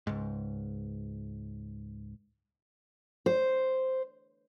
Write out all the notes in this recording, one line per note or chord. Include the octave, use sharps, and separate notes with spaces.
C#2 G#2
C5